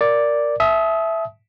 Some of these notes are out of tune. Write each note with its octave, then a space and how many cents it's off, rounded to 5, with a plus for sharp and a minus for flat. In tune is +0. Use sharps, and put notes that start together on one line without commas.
A#4 +0 D5 +0
E5 +0 A5 -40 D#6 +25